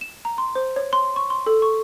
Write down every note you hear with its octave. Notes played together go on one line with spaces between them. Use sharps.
E7
A#5
C6
C5
C#5
C6
C#6
C6
A4
C#6